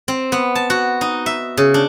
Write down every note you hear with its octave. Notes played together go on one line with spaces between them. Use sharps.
C4
B3
A5
F#4
D#4
E5
C#3
D4